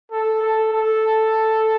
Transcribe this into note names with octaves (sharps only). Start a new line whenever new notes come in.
A4
A4
A4